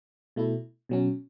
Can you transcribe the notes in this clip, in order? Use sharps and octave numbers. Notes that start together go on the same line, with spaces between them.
B2 A3 E4
B2 F#3 C#4